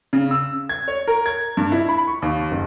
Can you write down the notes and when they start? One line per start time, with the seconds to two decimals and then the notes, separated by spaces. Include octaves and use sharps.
0.13 C#3
0.31 E6
0.69 G#6
0.88 C#5
1.08 A#4
1.26 G#6
1.57 G2
1.72 E4
1.89 B5
2.07 C#6
2.22 D#2
2.51 F#1